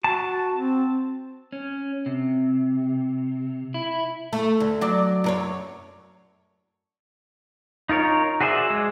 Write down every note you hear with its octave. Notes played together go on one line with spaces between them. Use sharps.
F#4 A5
C4
C#4
C3
E4
A3
D2
F#3 D5
F#2 A#4 C#5
D#4 F4 A#4 C#5
F#4 G#4 C5 D5 E5
G#3